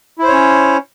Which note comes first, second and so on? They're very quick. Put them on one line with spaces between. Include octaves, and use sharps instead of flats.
E4 C5 C#5 C#4